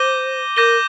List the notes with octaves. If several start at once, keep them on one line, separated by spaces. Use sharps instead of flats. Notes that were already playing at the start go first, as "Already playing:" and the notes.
Already playing: C5 D6 G6 A#6 D#7 G7
A#4 D6 G6 A#6 D#7 G7